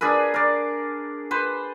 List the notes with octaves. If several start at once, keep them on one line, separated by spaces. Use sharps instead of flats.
D4 G#4 A#4 B4
A#4 D5
B4 C5